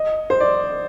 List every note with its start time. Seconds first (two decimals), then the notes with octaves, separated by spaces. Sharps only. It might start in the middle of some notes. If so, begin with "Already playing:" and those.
Already playing: D#5
0.30 C5
0.40 D5